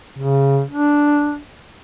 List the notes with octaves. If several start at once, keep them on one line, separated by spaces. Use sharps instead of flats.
C#3
D4